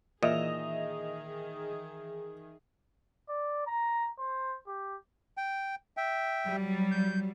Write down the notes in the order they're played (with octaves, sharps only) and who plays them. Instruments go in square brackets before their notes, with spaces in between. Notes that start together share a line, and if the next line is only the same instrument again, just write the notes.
[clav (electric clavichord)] A#2 [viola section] D#3 G#4 [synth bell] E3 E5 F7 [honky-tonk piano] D#5
[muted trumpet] D5
A#5
C5
G4
[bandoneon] G5
E5 G5
[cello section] F#3 G3
[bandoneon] G6